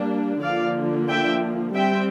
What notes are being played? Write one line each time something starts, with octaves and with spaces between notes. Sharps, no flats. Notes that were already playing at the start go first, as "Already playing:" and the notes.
Already playing: G3 A#3 D4
D3 F3 A#3 D5 F5
E5 G5
G3 C4 E5 G5